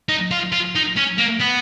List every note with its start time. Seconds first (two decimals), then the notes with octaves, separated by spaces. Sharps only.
0.09 D#4
0.31 F4
0.52 F4
0.75 D#4
0.97 C#4
1.18 A#3
1.40 B3